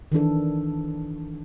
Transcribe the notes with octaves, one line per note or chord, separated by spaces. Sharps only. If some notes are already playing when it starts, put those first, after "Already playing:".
D#3 E3 D4 A4